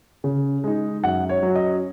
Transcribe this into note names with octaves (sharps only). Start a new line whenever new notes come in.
C#3
G#3 D#4
F#2 F#5
C#5
F#3 C#4
D#5